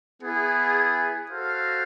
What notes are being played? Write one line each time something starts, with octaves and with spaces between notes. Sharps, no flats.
B3 E4 G#4
F#4 A4 C5 F5